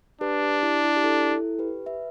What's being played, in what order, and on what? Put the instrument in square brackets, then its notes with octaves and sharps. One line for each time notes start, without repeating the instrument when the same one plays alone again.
[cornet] D4 [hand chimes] G4 B4
[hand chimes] G4
E4
E4
G4
E4 A4
E4 A4
G4 B4
B4 E5